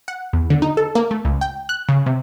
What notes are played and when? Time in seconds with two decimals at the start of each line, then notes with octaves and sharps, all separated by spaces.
0.08 F#5
0.33 E2
0.50 D3
0.62 D#4
0.77 A4
0.95 A#3
1.11 A3
1.25 C#2
1.41 G5
1.69 F#6
1.89 C#3
2.06 C3